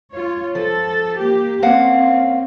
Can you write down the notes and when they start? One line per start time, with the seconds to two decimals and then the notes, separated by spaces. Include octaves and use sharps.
0.12 F4 C#5
0.55 F3 A4
1.17 A#3 G4
1.63 A#3 C4 C#4 F5 F#5